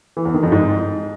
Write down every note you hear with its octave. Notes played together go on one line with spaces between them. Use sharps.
E3
E2
D#3
F2
G#2